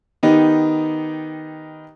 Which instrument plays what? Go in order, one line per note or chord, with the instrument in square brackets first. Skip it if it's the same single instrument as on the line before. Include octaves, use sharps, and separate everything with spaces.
[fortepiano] D#3 B3 D#4 G4